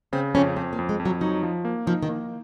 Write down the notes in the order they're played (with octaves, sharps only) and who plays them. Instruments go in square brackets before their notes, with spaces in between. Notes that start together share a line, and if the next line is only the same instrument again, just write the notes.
[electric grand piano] C#3 [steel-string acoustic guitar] C4
[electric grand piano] F2 [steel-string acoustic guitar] C#4
[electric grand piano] F2 [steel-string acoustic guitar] C4
[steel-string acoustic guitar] A#3
[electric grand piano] F2
[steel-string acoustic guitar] G#3
[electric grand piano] F2
[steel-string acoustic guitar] F#3
[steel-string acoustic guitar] F#3 [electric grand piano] D#4
[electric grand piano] F3
A#3
[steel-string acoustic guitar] F3 [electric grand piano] D#4
[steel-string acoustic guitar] D#3
[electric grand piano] A#3